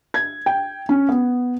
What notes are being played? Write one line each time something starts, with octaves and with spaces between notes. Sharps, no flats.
G#6
G5
C#4
B3